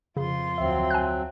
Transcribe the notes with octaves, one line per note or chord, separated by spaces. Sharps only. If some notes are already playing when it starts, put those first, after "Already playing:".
F2 C#3 F4 C6
D2 F#3 C4 E5
G#5 F#6